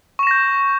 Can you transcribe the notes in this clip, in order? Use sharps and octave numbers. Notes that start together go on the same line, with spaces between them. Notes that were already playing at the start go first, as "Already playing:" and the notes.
C#6 G6 A#6 E7